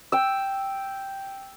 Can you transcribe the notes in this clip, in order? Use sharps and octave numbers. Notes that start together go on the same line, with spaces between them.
G5 E6